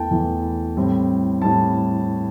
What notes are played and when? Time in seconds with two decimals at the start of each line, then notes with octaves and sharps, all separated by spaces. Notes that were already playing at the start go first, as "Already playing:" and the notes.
Already playing: E2 E3 A3 G5 A5
0.11 E2 E3 A3
0.77 A2 G3 C4
1.41 A2 G3 C4 A5